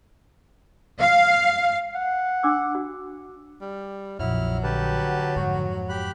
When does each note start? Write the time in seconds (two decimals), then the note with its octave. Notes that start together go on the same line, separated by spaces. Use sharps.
0.99 F5
1.95 F#5
2.43 D4 D6 E6
2.75 F#4
3.61 G3
4.19 A#1 F2 F#3 E4 F6
4.63 D3 G4 B4 A5
5.36 F2 G#2 F#4
5.89 G4 B5 F#6